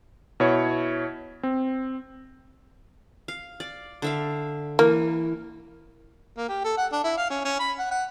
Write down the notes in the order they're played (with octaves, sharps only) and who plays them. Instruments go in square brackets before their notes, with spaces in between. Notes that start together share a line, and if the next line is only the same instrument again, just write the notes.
[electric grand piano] B2 E4 C#5
C4
[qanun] F5
D5
D3 E5 F5
[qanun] E3 [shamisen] A#3
[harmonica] A#3
G4
A4
F#5
D4
E4
F5
C#4
C#4
B5
F#5
F#5